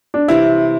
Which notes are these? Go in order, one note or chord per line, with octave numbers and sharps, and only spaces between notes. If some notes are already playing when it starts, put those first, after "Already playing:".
D4
C3 E3 G3 C4 E4